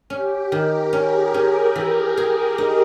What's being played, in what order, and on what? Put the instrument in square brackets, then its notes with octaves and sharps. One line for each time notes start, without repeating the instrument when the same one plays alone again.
[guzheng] C#4 [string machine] G4
[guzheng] D#3 [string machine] A#4
[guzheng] C#4 [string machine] G#4
[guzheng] C#4 [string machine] A#4
[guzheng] E3
G#4
D#4